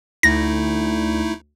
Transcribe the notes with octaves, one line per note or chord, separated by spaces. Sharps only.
D2 A3 D#4 E4 A#6